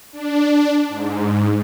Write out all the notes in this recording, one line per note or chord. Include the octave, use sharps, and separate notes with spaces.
D4
G#2